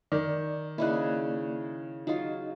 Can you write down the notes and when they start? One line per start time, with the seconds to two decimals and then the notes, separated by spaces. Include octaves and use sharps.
0.12 D#3 D5
0.78 C#3 A#3 D#4 E4 D5 F#6
2.07 F#3 D#4 F4 D#5